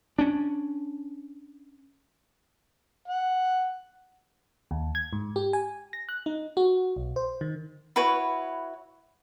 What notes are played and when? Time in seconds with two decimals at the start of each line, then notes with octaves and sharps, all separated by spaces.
0.19 C#4 D4
3.08 F#5
4.71 D#2
4.95 G#6
5.13 G#2
5.36 G4
5.53 G#5
5.93 A#6
6.09 F#6
6.26 D#4
6.57 F#4
6.96 B1
7.16 C5
7.41 D#3
7.96 E4 F#4 B4 C#5